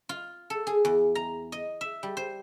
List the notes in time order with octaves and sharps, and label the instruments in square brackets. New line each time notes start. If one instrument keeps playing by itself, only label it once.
[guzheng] F4
A4
G#4
E2
A#5
D#5
E5
G3
C5